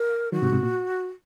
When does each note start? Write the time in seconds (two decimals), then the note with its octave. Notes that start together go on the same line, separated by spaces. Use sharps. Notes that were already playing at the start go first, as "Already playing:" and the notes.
Already playing: A#4
0.32 D#3 F#3 F#4
0.42 G#2 C3
0.52 G#2 C3
0.63 A#2